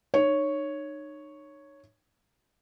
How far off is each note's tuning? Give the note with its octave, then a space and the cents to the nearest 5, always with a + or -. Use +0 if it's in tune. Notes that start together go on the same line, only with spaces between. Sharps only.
D#4 -35 C#5 +0